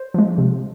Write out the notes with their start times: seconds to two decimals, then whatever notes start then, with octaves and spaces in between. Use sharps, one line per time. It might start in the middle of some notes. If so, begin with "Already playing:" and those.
Already playing: C5
0.14 F3 G#3
0.38 C3